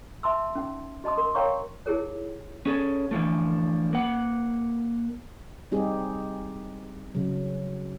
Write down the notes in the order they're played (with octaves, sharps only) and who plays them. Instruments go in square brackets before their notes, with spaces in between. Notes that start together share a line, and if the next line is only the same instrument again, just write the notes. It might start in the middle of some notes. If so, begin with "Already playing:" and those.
[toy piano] E5 A5 C6 E6
C#4 D#4 F#5
F#4 D#5 A5 C6 D#6
A#4 C6
A#4 C#5 F5 G5 A#5 C#6
D#4 E4 G4 G#4 A#4 C#5
[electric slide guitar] C#4 G#4 A4
D3 E3 F3 A3
A#3 F#5
[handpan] G3 C4 D#4 G4 G#4
C#3 F#3